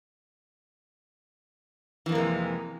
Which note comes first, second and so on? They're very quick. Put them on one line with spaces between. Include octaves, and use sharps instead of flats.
E3 F2 A#3 C3 G#3